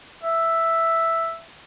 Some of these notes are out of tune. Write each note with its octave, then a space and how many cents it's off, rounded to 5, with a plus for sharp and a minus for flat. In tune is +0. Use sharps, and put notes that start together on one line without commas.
E5 +0